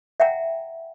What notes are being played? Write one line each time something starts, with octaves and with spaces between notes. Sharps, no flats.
E5 F#5 G5 A#5